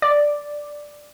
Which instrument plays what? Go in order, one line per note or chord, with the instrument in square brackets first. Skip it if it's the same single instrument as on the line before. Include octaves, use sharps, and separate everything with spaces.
[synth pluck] D5